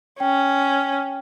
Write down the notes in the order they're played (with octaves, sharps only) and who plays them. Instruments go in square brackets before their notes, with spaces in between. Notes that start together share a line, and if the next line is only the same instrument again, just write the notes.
[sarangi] C#4 [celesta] G5